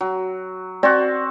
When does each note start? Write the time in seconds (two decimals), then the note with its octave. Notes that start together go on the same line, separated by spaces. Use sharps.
0.01 F#3
0.83 C4 F#4 D5